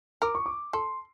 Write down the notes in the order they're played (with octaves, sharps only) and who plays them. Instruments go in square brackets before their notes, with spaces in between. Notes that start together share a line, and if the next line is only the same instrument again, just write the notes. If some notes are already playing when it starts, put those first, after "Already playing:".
[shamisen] A#4 [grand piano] D6
[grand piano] C#6
D6
[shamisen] A4 [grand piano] C6